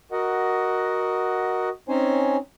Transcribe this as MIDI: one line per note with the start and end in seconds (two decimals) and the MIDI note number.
0.12 1.69 66
0.12 1.69 70
0.12 1.69 75
0.12 1.69 78
1.89 2.37 60
1.89 2.37 61
1.89 2.37 63
1.89 2.37 72
1.89 2.37 73
1.89 2.37 80